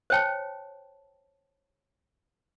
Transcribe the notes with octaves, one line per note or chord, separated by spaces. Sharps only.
C5 C#5 G5 A5